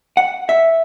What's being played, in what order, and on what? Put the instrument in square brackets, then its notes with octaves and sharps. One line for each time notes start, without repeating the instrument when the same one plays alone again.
[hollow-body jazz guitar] F#5
E5